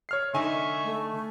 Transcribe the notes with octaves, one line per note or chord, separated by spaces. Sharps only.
C#5 F6 C7
D3 D#4 E5 G#5 C#6
A3